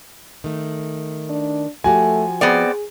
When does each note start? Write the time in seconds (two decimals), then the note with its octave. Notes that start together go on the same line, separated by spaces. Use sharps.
0.44 D#3 A3
1.29 D4
1.84 F3 A3 F#4 G4 G#5
2.41 B3 C4 G#4 D5